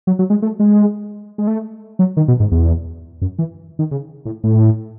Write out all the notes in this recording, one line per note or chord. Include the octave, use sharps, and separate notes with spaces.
F#3
F#3
G#3
A3
G#3
G#3
A3
F#3
D#3
B2
G#2
E2
F#2
E3
D#3
C#3
A2
A2